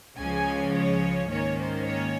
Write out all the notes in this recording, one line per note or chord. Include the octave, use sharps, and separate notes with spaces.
C#2 C#3 F3 G#3 C#4 G#5
C#5
G#2 D#3 A#3 C#4 C#5
C5
C#5